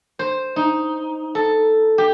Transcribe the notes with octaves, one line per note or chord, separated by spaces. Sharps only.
C5
D#4
A4
G4